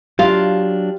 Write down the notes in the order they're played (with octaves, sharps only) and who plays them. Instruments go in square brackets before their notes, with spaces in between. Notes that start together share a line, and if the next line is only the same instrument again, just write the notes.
[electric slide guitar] F#3 D4 [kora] F4 F5 [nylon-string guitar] G4